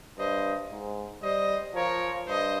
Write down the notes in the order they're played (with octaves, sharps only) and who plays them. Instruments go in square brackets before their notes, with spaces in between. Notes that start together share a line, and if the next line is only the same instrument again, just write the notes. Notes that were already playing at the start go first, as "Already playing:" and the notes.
[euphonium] G2 [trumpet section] C5 D#5
[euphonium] G#2
[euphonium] G3 [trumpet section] C5 D#5
[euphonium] F3 [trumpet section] A#4 C#5
[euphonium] G2 [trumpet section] C5 D#5